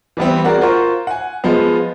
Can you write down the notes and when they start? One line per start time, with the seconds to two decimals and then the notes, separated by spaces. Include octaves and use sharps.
0.17 E3 G3 B3 C4
0.44 F#4 G#4 A#4 D5 F#5
0.61 F4 A#4 C5 F#5 C#6
1.07 F#5 G#5
1.44 F3 G#3 B3